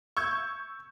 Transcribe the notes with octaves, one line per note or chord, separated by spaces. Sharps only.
C#6 E6 G6 G#6